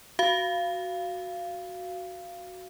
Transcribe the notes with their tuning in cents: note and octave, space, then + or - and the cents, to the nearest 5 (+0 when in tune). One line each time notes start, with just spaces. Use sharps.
F#4 +0 F5 -15